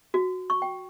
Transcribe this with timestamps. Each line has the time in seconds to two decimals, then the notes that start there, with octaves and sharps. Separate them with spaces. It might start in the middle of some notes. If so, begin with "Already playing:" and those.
0.14 F#4
0.50 C#6
0.62 G5